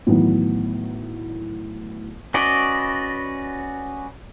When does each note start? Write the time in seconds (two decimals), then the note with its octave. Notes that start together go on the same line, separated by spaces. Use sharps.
0.07 A2 D#3 E3 F#3 B3
2.34 C#4 F#4 B4 D5 D#5